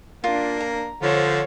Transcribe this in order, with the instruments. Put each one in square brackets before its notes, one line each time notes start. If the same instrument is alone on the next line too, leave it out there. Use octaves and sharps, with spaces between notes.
[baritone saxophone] A#3 [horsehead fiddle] D4 [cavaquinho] F4
[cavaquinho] A#5
[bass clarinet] D3 [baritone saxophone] F3 [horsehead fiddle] C5 C#5